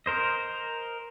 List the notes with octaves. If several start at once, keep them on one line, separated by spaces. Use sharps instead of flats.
A#4 C5 D#5